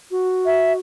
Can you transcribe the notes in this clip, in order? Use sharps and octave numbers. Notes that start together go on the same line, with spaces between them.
F#4
E5